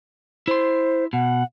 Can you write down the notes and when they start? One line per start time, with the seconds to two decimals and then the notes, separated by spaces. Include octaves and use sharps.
0.48 E4 C5 C6
1.13 B2 F#5